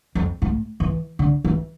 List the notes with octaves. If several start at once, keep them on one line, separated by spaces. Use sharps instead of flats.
F2
A2
E3
D3
E3